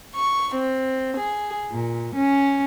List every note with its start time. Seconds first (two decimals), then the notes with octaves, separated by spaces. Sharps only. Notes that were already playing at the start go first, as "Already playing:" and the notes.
0.15 C#6
0.55 C4
1.17 G#4
1.72 A#2
2.16 C#4